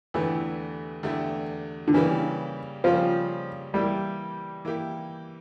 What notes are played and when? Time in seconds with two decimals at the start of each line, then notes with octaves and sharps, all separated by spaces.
0.14 E2 D3 E3 A3 E4 G4
1.03 E2 D3 A3 E4 G4
1.88 D3
1.94 C#3 E3 G3 A#3 C#4 G4
2.84 C#3 F3 G3 A#3 C#4 G4
3.74 E3 G3 A#3 E4 G4
4.65 E3 A#3 E4 G4